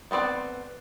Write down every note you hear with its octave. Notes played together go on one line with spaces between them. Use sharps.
A3 B3 C4 D5